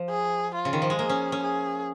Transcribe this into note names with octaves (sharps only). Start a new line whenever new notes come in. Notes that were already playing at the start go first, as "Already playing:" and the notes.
Already playing: F3
G#4
F4
C#3
D#3
F3
G#3
A#3 G#4
C#4
C#4
G#4